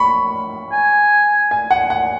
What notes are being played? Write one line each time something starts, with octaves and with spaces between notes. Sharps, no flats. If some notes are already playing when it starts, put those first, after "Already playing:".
Already playing: B5 C#6
G#5
G#5
F#5
F#5